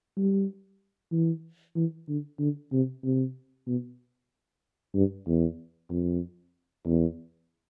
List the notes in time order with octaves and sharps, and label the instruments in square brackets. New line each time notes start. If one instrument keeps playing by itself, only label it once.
[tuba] G3
E3
E3
D3
D3
C3
C3
B2
G2
E2
F2
E2